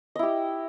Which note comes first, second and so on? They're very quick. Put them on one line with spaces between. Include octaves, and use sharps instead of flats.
D#5 E4 G4